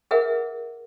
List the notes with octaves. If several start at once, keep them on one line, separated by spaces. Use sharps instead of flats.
G#4 A#4 B4 E5 F#5